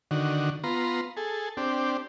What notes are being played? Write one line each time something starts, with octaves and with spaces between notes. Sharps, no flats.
D3 D#3 F#4
B3 F4 A#5 C6
G#4 A4
C4 D4 G4